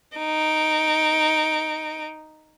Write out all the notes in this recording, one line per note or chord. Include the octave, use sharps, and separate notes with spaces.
D#4 D7